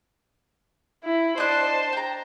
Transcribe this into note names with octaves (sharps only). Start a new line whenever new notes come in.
E4
D4 C5 D#5 A5 F#6
G5 A#5